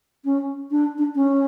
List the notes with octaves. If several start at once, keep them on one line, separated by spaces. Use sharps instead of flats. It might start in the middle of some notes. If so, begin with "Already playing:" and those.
C#4
D4
D4
C#4